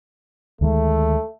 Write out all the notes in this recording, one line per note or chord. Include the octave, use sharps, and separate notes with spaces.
D2 D#3 G#3 A3